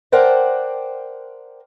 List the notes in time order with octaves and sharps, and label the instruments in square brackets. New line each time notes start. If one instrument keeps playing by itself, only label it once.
[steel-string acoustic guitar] A#4 C5 D5 F#5 G5 A5